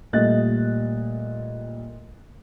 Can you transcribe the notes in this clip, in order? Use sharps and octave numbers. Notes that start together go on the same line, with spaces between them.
A#2 G3 A3 D#5 F#6 A6